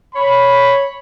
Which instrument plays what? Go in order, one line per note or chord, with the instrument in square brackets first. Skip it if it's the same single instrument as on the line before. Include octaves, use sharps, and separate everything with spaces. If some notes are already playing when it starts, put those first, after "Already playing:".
[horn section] C#5 B5